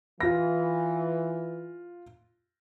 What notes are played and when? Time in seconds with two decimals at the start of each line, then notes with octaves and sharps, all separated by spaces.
0.20 E3 F4 A#6